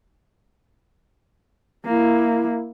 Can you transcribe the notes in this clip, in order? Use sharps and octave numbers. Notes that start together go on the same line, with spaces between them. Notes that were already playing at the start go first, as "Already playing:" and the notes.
A#3 E4